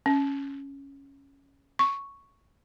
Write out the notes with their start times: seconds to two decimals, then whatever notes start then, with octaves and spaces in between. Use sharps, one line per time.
0.06 C#4
1.79 C#6